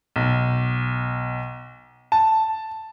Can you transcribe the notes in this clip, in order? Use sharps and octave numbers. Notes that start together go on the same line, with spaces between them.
B1
A5